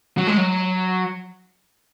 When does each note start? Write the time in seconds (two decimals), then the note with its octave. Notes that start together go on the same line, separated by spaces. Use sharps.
0.18 F#3
0.27 G#3
0.37 F#3